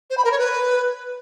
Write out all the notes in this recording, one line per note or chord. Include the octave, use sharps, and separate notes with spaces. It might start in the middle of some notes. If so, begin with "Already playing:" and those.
C5
B5
A#4
C#5
B4